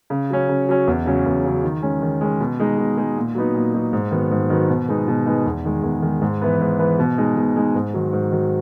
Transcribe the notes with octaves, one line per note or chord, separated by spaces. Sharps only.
C#3
F#3 C#4
C#3
F#3 C#4
E2
C#3 F#3 C#4
E2
C#3 F#3 C#4
D#3
G#3 C#4
D#3
G#3 C#4
B2
G#3 D#4
B2
G#3 D#4
A#2
F#3 B3 D#4
A#2
F#3 B3 D#4
G#2
D#3 F#3 B3
G#2
D#3 F#3 B3
B2
G#3 B3 D#4
B2
G#3 B3 D#4
E2
D#3 G#3
E2
D#3 G#3
G#2
E3 B3
G#2
E3 B3
B2
G#3 D#4
B2
G#3 D#4
G#2
D#3 F#3
G#2
D#3 F#3